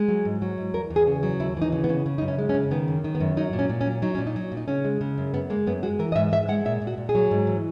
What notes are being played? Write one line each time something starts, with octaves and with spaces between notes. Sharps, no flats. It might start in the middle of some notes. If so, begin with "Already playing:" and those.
Already playing: G#3
F#3
G#2
F#3
G#2
E2 A#4
E2
G#4
C#3
F#3
D#2 E4
E3 D#4
C#3
B3
C#3
C#3
F#2 D#4
C#4
G#3
C#4
C#3
D#3 B3
F#2
D#3
B3
F#2
F#3 D#4
A#2
C#4
A#2
C#4
F#3
F#3 D#4
A#2 C#4
D#4
F#3
A#2
D#4
C#3 C#4
G#3
C#3
F#2
F#2 B3
G#3 A#3
F#2 B3
G#3 F#4
E3 A#4
D#5
G#2 E5
G#2 E5
G#3 F#5
A#2 E5
A#2
F#4
A#2
G#4
F#3
G#2
E3